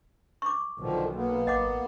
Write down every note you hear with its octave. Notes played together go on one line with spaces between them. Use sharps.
C#6 D6
B1 D3 D#3 F3
A#3 B3
G#1 D#5 F#5 D6